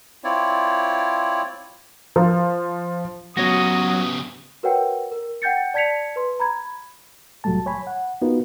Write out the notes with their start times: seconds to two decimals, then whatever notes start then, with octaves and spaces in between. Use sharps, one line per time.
0.24 C4 E4 F4 C#5 D5
2.16 F3
3.37 C#3 F#3 B3 F#4 C#5 D#6 A#6
4.63 F#4 A#4 B4 C#5 F#5 G5
5.12 A#4
5.42 F#5 G5 G6 A6 C#7
5.74 D5 A5 G#6 B6 C#7 F7
6.16 B4 C6
6.40 A#5 B5 G#6
7.44 C2 A2 F#3 G3 A3 A5
7.66 C#5 G#5 B5
7.87 F#5
8.22 B3 D#4 F4 F#4 A#4 B4